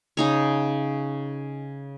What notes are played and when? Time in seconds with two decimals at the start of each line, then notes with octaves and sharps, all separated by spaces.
0.17 C#3 D#4 C#5